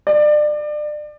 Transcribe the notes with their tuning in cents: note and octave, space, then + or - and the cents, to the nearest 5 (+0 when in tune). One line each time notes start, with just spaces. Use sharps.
D5 +30